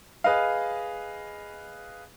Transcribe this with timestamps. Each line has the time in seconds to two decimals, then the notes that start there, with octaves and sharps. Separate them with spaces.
0.24 G#4 B4 D#5 F5